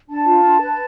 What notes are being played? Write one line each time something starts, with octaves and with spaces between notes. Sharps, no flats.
D4 A5
F4
D4
B4